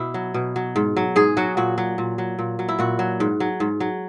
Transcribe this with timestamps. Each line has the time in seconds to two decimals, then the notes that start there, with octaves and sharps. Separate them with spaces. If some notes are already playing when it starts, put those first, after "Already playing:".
Already playing: B2 E4
0.14 F#3
0.34 B2
0.56 F#3
0.76 G#2
0.96 F#3
1.16 G#2 G#4
1.37 F#3 F#4
1.57 A#2 F#4
1.78 F#3
1.98 A#2
2.18 F#3
2.39 A#2
2.59 F#3
2.69 E4
2.79 A#2 F#4
2.99 F#3
3.20 G#2
3.40 F#3
3.60 G#2
3.80 F#3